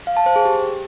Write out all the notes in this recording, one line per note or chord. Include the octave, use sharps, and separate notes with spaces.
F5
A5
C5
G#4
G4